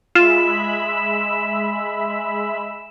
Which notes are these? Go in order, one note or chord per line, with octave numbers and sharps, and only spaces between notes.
G#3 F4 E5 B5 E7